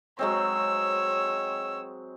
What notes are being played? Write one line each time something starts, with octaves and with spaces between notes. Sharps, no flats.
F#3 G#3 C4 C#5 E6